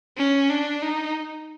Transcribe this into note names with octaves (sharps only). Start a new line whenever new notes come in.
C#4
D4
D#4